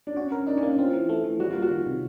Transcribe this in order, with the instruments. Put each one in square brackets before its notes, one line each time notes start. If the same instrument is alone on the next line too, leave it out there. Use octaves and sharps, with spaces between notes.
[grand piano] D4
[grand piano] C#4 [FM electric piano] F#4
[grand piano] C#4 [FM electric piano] A#4
[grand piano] D4 [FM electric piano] D#4
[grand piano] C#4
[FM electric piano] A#3
[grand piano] D4
[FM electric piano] C4 [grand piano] F4
[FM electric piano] E3
A3
E3
[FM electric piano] G3 [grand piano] F#4
[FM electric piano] A#3 [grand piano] F4
[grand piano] F#4
[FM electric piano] D#3
C3